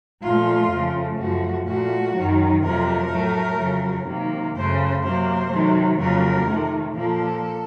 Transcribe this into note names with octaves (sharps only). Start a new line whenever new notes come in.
A#2 F3 A3 F4
F2 C#3 F3 A3
F#2 F3 A3 F#4
A#2 A3 F#4
F#2 D#3 F#3
F2 C3 F#3 A3 A#4
A2 F#3 A3
F2 C#3 F#3
C3 D#3 F#3 A#3
F#2 C#3 A3 C5
C3 F#3 A#3 C5
C3 D#3 F#3 A3
F2 C#3 F#3 A#3 A#4
C3 D#3 A3
A#2 F3 A#3 A4